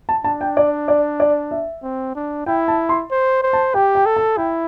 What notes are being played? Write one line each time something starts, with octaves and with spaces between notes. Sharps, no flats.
A5
D4 A5
G5
D5
D5
D5
E5
C4
D4
E4 G5
A5
C6
C5
C5
A5
G4 G5
G5
A4
A5
E4 G5